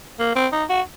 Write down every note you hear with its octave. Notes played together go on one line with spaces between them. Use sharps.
A#3
C4
D#4
F#4